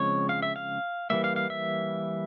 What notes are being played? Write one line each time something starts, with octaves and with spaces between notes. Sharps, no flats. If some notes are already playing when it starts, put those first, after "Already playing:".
Already playing: C#3 F3 G#3 C4 C#5
F5
E5
F5
E3 G3 A#3 E5
F5
F5
E5